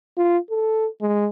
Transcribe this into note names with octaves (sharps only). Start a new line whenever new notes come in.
F4
A4
G#3